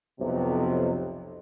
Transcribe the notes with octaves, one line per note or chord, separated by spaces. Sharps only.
B1 F2 C3